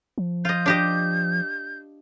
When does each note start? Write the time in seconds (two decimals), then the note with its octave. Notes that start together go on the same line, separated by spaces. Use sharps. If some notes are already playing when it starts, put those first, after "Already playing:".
0.18 F3
0.45 F4 D#5 G6
0.66 D4 G4 D#5